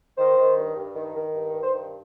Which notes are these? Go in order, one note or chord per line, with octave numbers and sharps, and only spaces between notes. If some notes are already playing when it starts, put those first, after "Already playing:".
D#3 C5
D#3
G2
G2
D#3
D#3
G2
G2
C5
D#3